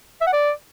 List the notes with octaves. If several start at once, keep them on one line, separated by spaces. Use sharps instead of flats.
E5
F#5
D5